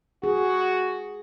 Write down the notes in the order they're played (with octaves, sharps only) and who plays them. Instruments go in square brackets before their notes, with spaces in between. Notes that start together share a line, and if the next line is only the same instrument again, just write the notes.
[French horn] F#4 [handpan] G#4